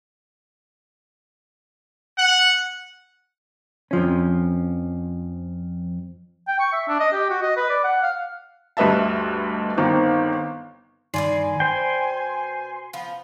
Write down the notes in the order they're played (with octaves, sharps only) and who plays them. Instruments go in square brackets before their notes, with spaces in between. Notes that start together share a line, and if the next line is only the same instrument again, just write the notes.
[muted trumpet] F#5
[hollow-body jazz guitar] F2 F3 C#4
[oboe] G5
C#6
E5
D4
D#5
G4
F#4
D#5
B4
D5
F#5
F5
[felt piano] D2 G2 B4 D#5 E5 A5
G1 D#3 C4 D#4
[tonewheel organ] G2 D#3 C6 [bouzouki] B2 E3 D5 [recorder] G#5
[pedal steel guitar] C5 G5 [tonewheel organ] C6
[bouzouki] F3 B3